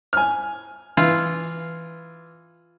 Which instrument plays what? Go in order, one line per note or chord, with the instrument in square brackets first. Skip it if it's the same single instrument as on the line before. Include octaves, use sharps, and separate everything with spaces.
[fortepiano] G#5 F6
[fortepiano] E3 [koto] F4